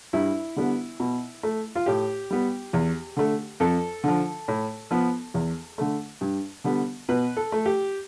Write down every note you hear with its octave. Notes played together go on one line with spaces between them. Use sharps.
G2 E4
D3 G3 B3
B2
A3
F4
A2 G4
G3 B3
E2
D3 A3
F2 A4
D3 F3
A2
F3 B3
E2
D3 A3
G2
D3 G3 B3
B2 B4
A4
A3
G4